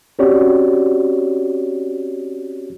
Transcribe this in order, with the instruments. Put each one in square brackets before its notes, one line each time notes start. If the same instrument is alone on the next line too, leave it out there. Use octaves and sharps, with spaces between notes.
[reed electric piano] C4 C#4 F#4 G4 C#5 D5